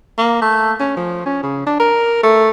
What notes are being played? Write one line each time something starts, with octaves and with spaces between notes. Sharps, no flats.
A#3
A3
C#4
F3
C#4
C#3
D4
A#4
A3